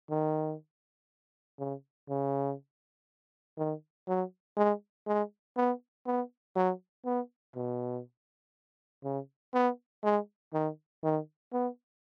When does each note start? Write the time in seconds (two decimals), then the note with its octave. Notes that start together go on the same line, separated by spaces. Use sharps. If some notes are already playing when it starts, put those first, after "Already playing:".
0.10 D#3
1.59 C#3
2.09 C#3
3.58 D#3
4.08 F#3
4.57 G#3
5.07 G#3
5.57 B3
6.06 B3
6.56 F#3
7.05 B3
7.56 B2
9.04 C#3
9.54 B3
10.04 G#3
10.54 D#3
11.03 D#3
11.53 B3